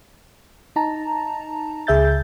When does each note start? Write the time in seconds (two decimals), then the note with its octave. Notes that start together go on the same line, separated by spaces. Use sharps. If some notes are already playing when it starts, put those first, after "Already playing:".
0.76 D#4 A5 A#5
1.87 C#2 G#4 E5 G6 A6